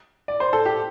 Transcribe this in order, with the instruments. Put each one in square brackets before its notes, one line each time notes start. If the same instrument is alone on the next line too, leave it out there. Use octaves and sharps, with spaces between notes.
[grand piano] D5
C5
A4
G4